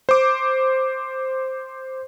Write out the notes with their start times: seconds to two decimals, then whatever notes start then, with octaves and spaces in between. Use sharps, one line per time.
0.09 C5 D6